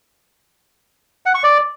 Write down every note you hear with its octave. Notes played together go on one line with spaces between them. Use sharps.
F#5
C#6
D5